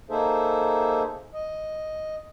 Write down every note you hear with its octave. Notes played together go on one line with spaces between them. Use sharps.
A#3 D#4 G#4 A4 C5 E5
D#5